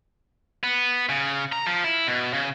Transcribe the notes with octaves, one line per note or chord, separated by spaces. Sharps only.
B3
C#3
A#5
F3
E4
B2
C#3